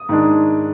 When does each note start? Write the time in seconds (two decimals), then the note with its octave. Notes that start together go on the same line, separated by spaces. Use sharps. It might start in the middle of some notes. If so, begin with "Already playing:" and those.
Already playing: D#6
0.09 G#2 D#3 G#3 D4